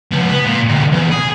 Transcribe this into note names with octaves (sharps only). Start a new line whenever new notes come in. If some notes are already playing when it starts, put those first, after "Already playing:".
C#2 B3
B3 B4
A#2
D2 C3
E2
G#4